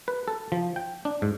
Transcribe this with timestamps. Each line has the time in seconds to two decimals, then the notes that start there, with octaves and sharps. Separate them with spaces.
0.08 B4
0.28 A4
0.52 F3
0.76 G5
1.05 D4
1.22 G#2